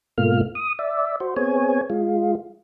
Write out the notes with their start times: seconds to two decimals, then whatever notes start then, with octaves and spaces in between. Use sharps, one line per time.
0.18 G#2 B2 A3 A#3 F4 F6
0.55 D#6
0.79 D5 E5
1.20 F#4 C5
1.36 B3 C4 G#4 C#5 G#5
1.90 G#3 F4